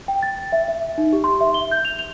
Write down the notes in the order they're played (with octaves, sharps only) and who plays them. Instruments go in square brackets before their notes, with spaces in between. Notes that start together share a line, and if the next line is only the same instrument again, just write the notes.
[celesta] G5
A6
E5
E5
D#4
G4
C6
E5
G7
G6
F7
F7